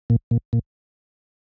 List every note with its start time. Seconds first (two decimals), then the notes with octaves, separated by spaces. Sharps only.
0.10 A#2
0.31 A#2
0.53 A#2